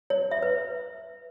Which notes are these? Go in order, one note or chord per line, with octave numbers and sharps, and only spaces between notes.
C#5
E5
B4